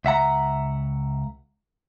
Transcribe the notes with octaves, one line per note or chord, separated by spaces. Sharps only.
C#2 E5 F#5 A#5